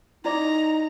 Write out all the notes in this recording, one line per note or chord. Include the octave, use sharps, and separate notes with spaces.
D#4 E4 D5 A#5 D6